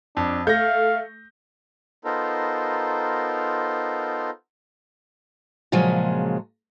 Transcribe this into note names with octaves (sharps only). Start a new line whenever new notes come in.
F2 D4
A3 F5 G6 A#6
B3 D#4 F4 A4 A#4 C5
A#2 C#3 F3 F#3 G#3